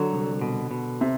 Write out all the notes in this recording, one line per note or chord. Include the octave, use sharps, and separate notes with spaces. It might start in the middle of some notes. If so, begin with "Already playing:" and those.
Already playing: D3 F#3
C2
B2
B2
C3